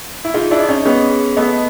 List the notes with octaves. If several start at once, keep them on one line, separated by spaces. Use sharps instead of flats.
E4
D#4 F4 G#4
D4 E4
D#5
C#4 D#4
B3 C#4 G#4
G#4
A3 B3 D#5